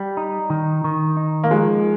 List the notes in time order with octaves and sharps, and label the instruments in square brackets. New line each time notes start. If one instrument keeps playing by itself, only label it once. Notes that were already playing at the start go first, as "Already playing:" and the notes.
Already playing: [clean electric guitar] G3
D#4
D#3
D#3
D#4
[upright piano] A#3
[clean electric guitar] F3 [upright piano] G#3